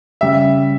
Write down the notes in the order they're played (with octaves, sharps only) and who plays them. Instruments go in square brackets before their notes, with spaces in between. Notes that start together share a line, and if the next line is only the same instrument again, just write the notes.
[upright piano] C#3 G3 E5